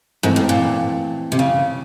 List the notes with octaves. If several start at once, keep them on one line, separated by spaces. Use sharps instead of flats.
G#2 E3 A3 C4
A2
A#2
C3
C#3